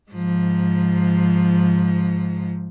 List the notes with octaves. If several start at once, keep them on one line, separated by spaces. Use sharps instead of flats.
G#2 F3